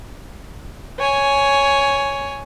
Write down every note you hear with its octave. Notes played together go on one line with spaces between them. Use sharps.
C#5 G#5